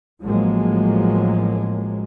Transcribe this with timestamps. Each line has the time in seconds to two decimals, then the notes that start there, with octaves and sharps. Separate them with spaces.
0.23 A1 A2 F3 F#3 G#3 A#3